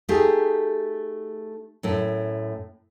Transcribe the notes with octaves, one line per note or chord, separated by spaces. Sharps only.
A3 D#4 G4 G#4
F#2 A2